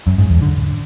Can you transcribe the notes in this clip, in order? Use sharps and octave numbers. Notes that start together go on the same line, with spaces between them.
F#2
G#2
E2
D3